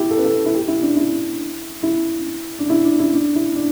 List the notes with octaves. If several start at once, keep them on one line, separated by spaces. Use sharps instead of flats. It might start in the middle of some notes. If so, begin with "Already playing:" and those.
Already playing: E4 G4
A4
B4
A4
E4
G4
E4
D4
E4
E4
D4
E4
D4
E4
D4
E4
D4